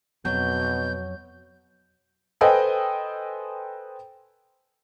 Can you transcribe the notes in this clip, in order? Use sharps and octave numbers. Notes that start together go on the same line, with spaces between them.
F2 B2 F#3 G6
A4 B4 C5 D#5 G5 G#5